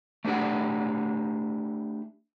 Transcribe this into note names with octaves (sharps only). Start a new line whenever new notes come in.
A3 D4 E4 G4 F#5